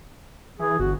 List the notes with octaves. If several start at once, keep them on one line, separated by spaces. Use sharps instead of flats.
E3 G#4
G1 F#4